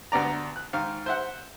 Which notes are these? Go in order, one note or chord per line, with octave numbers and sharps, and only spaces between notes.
D2 B3 D5 A#5
F#6
G#2 D#3 F5
C5 E5 F#5